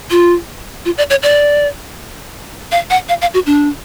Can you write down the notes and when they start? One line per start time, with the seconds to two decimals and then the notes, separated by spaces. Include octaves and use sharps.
0.11 F4
0.85 F4
0.98 D5
1.10 C#5
1.23 D5
2.72 F5
2.90 F#5
3.09 F5
3.21 F5
3.34 F#4
3.46 D4